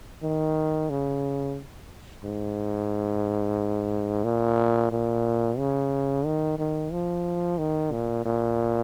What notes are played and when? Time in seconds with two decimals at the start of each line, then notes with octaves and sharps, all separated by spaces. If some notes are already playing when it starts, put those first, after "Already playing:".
0.23 D#3
0.90 C#3
2.24 G#2
4.24 A#2
4.92 A#2
5.58 C#3
6.25 D#3
6.59 D#3
6.92 F3
7.58 D#3
7.92 A#2
8.26 A#2